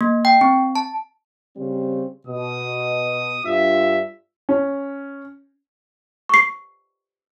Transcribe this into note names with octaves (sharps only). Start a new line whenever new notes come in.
A#3
G5
C4
A5
C#3 G3 C4
B2 D#6
G2 D4 F4 E5
C#4
C#6 C7